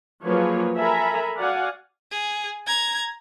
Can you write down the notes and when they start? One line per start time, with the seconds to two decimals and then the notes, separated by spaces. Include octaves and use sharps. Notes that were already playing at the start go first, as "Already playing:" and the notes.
0.24 F3 F#3 A#3 G#4 B4 C#5
0.78 A4 A#4 E5 G#5 A#5 B5
1.39 F#4 D5 F5 F#5 G#5
2.11 G#4
2.67 A#5 G#6